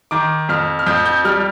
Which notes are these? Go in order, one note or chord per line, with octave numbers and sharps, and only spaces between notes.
D#3 D6
F2 F6
F6
F2 G6
G6
G3 F6